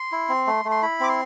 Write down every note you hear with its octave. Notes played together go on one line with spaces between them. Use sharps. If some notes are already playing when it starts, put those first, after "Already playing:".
Already playing: C6
E4
C4
A3
A3
C6
E4 B5
C4 D6
C6